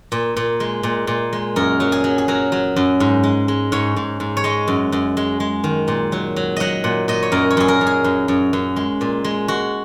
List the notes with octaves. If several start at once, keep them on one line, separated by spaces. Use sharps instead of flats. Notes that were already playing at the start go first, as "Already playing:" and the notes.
A#2
A#2
G#3
A#2
A#2
G#3
F#2 A#4
F#3
G#4
F#3
G#4
F#3 A#4
F#3
F#2
G#2
G#3
G#3
G#2 C#5
G#2
G#2
C#5
G#3 D#5
F#2
F#2
G#3
G#3
D#3
A#2
F#3
F#3
F#3 D#5 F#5
A#2 F#5
A#2 D#5
C#5
F#2 A#4
C#5
F#2 G#4
A#4
F#2
G#4
F#2
F#2
F#2
G#3
A#2
G#3
G#3 F#4